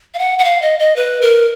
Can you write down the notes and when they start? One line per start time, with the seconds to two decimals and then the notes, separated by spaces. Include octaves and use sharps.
0.14 F5
0.19 F#5
0.39 F#5
0.44 F5
0.62 D#5
0.79 D#5
0.96 B4
1.22 A#4